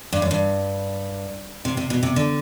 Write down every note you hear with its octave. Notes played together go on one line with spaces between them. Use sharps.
G2
F#2
G2
C3
C3
B2
C3
D3